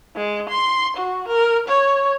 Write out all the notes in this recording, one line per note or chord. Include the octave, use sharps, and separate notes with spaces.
G#3
C6
F#4
A#4
C#5